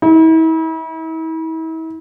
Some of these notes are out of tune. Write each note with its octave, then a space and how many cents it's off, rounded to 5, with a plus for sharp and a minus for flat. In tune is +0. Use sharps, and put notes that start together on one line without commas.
E4 -40